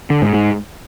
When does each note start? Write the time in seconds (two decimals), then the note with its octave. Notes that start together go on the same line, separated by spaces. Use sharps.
0.10 D3
0.22 G#2
0.34 G#2